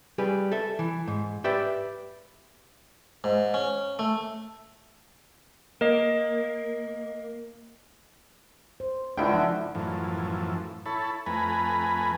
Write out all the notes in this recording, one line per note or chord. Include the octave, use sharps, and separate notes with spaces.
G3 G#4 B4
A4 E5
E3
G#2
G4 B4 D5 E5 G5
G#2
C#4
A3
A#3 A#4 D#5
C5
C#2 D3 D4 E4 F#4 G5
F3 D#4
F#2 A2 E3 F3
E4 A4 C#5 A5 B5
F2 A3 B4 G#5 A#5 B5